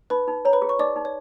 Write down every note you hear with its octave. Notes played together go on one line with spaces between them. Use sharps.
D#4 B4 B5
D#4
C#5 A#5
B4 B5
G#4
C#6
D#4 D5 D6
D#4
C#5